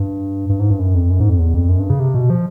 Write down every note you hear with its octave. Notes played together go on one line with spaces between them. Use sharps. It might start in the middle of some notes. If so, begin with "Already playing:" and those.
Already playing: G2
G2
G#2
G2
F#2
F2
F#2
G#2
F2
E2
F2
F#2
G2
C#3
C3
B2
F3